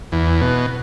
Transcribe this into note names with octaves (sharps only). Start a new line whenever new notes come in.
E2
B2